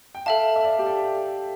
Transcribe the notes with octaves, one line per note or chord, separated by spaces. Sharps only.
G5
A4 E5 F5 A5
E5
D5
G4
A4